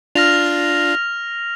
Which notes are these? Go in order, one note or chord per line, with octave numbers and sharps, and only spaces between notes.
D4 F4 F6 A#6 F7